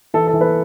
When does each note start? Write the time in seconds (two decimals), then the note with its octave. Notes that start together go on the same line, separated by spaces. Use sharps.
0.14 E3 A4
0.27 A4
0.33 E3
0.41 B4